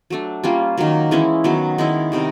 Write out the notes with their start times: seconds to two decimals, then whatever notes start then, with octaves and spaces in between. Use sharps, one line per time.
0.10 F#3 A3 D4
0.44 G3 A#3 C#4 F4
0.77 D#3 F#3 A#3
1.11 E3 G#3 C#4 E4
1.44 D#3 F#3 B3
1.78 D#3 G#3 C#4 E4
2.12 C3 D#3 G3